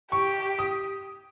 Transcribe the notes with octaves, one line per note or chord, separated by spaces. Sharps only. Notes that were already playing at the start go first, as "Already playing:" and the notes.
G4 C#6
D#6